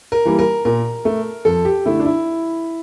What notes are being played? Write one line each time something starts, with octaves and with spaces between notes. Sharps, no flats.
A#4
E3 G3 A#3
A#4
A#2 A#4
A3
F2 A4
G4
D3 A3 E4
D4
E4